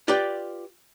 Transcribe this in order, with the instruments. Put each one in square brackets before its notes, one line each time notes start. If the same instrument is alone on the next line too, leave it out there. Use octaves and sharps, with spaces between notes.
[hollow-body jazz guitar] F4 G4 B4 D5 G5